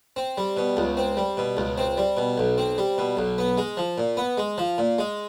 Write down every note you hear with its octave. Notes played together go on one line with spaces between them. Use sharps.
C4
G3
B2
C#2
C4
G3
B2
C#2
C4
G3
B2
B1
C4
G3
B2
B1
B3
G#3
F3
A#2
B3
G#3
F3
A#2
G#3